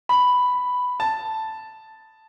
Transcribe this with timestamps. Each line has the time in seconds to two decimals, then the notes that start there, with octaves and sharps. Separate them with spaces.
0.09 B5
1.00 A5